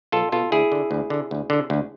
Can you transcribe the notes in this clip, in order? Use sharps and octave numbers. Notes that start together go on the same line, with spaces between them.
B1 F4 A4
B2 F4 A4
D2 E4 G#4
D3
D2
D3
D2
D3
D2